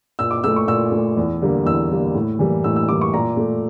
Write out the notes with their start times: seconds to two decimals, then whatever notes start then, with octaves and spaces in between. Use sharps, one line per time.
0.19 A#2 E6
0.31 D6
0.44 A3 E6
0.56 C#6
0.67 A#2 E6
0.92 A3
1.17 E2
1.42 D3 G3 A#3
1.66 E2 E6
1.90 D3 G3 A#3
2.15 A2
2.39 E3 G3 A#3
2.64 A2 E6
2.76 E6
2.89 E3 G3 A#3 D6
3.01 C#6
3.13 A#2 A#5
3.37 A3